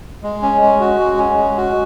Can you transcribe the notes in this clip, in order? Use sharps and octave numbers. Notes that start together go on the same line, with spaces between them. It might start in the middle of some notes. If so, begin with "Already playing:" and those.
G#3
C#4
G#3
F#4
G#3
C#4
G#3
F#4